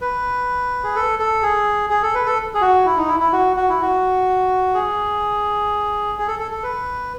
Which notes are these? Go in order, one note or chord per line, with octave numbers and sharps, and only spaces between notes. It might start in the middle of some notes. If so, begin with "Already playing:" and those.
B4
G#4
A4
A4
G#4
G#4
A4
B4
A4
G#4
F#4
E4
D#4
E4
E4
F#4
F#4
E4
F#4
G#4
G#4
A4
A4
A4
B4